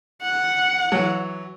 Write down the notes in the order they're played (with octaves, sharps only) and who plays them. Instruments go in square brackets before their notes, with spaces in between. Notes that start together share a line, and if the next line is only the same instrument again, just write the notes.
[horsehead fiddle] F#5
[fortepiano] E3 F#3